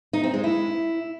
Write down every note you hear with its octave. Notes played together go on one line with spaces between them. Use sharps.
D#4
C4
G#3
E4